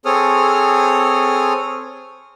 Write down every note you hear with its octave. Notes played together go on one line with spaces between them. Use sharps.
C4 G#4 A4 C#5 D#6 F6